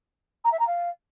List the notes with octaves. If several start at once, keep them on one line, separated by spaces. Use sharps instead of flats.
A#5
E5
A#5
F5